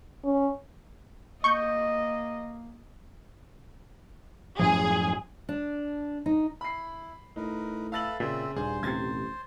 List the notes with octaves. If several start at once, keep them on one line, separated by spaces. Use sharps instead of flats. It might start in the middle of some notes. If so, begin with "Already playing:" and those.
C#4
A#3 D#5 C#6 G6
F#2 A2 F3 G#4
D4
D#4
E4 B5 C7
A2 D#4 A#4 B4
A4 B4 E5 F5 A6 F#7
A#2 C#3 C4 E5
D#1 G2 G#4 C5
D#1 A1 C3 G#6 A6